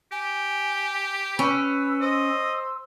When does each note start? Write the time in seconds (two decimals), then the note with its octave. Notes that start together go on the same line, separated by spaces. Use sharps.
0.12 G4 G#5
1.39 C#4 B4 E6
2.01 C5 D#5